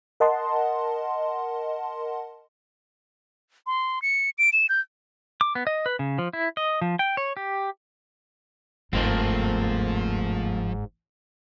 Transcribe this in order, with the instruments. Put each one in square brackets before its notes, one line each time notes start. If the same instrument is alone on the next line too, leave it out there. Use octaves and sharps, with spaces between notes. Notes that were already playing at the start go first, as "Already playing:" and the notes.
[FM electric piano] A#4 D#5 F#5 A5 C6
[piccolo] C6
C#7
D7
E7
G6
[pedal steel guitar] D6
B3
D#5
B4
C#3
F3
E4
D#5
F3
G5
C#5
G4
[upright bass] G1 D#2 [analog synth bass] G#2 [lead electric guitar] F3 [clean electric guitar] A3 A#3 C4